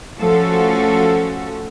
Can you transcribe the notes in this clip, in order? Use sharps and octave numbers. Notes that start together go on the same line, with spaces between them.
F3 A3 C#4 F#4 A4